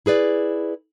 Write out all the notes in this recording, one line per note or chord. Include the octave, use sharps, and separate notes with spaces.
E4 G#4 B4 D5